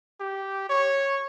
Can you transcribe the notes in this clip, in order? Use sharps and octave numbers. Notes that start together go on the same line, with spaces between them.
G4
C#5